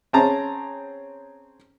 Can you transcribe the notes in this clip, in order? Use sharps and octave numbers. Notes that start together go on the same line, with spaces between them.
C4 C#4 G#4 C5 A5 A#5